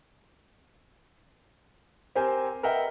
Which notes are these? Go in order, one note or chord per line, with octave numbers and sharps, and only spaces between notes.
C4 G4 A#4 C5 G5 G#5
A#4 B4 D#5 E5 F#5 G5